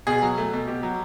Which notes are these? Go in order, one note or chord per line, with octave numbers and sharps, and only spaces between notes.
B2 G#4
F#3
A3
B2
B2 G4
F#3